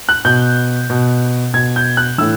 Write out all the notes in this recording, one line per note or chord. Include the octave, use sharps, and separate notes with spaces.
F#6
B2 G6
B2
B2 G#6
G6
F#6
A2 E3 E6